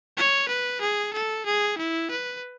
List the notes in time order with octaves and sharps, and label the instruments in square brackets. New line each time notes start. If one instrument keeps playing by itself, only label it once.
[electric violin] C#5
B4
G#4
A4
G#4
E4
B4